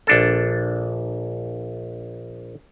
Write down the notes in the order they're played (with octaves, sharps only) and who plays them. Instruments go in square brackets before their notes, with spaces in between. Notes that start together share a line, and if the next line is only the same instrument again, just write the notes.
[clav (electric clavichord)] A#1 D4 A4